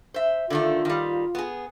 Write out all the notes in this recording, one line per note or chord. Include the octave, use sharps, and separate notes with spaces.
C5 E5
D3 D#3 A3 F4
D#3 G3
B3 G#4